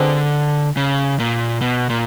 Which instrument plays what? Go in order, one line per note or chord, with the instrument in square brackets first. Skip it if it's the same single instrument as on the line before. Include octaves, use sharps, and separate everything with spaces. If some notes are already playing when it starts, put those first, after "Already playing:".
Already playing: [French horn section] B2 G#3 C4 F4 G#4 [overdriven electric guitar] D3
[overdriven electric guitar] C#3
A#2
B2
A#2